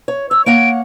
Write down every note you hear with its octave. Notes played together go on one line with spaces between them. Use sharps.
C#5
C#5 E6
A#3 C#5 F#5 D7